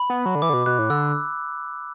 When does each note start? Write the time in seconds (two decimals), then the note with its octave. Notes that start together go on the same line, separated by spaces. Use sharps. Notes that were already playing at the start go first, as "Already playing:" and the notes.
Already playing: B5
0.10 B3
0.26 F#3
0.35 D3
0.42 E3 D6
0.50 D3
0.53 B2
0.66 B2 F#6
0.79 A2
0.90 D3 E6